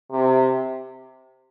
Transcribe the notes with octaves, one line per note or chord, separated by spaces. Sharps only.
C3